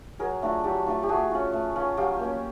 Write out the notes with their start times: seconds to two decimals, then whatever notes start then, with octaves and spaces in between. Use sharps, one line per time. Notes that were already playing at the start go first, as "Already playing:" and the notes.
0.19 F#3 G#4 A#4
0.42 A3 D4 F4
0.64 F#3 G4 A4
0.86 A3 D4 F4
1.03 G4
1.09 A3 F#4 G#4
1.31 C#4 F4
1.53 A3
1.76 C#4 F4
1.97 F#3 F4 G4
2.19 A#3 C#4